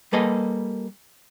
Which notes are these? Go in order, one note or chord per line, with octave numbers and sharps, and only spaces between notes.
G3 A#3 G#4 A4 B4 D#5